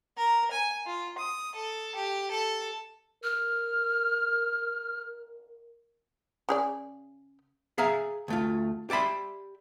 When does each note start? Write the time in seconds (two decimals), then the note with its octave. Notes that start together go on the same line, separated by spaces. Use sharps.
0.17 A#4
0.51 G#5
0.86 F4
1.18 D#6
1.55 A4
1.95 G4
2.31 A4
3.24 A#4 F6
6.49 C#3 G#4 D5
7.78 G#4 E5 F5 A#5
8.28 D2 A3 F4
8.90 G4 D5 E5 B5 C6